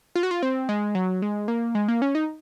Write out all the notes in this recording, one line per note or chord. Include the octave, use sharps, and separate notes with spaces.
F4
F#4
F4
C4
G#3
F#3
G#3
A#3
G#3
A#3
C#4
D#4